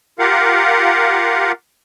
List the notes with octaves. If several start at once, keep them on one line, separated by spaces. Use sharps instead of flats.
F4 G4 A#4 F5 F#5